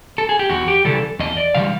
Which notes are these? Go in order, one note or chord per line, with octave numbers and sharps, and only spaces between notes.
A4
G#4
G4
E2 F#4
G4
C#3 E3 G3 A4
E2 D#5
D5
C#3 E3 G3 F5